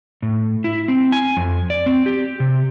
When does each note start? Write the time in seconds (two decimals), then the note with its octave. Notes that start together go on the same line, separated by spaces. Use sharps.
0.22 A2
0.64 E4
0.88 C4
1.12 G#5
1.37 F2
1.70 D5
1.86 C4
2.06 G4
2.40 C3